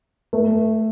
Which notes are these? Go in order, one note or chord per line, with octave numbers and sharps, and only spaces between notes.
A3